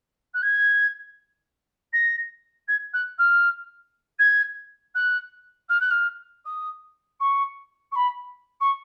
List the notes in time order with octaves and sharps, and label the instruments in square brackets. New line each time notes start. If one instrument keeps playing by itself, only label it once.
[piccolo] F#6
G#6
A#6
G#6
F#6
F6
G#6
F#6
F6
F#6
F6
D#6
C#6
C#6
B5
C#6